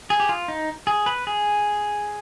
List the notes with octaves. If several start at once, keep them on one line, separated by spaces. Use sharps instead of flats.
G#4
G4
F4
D#4
G#4
B4
G#4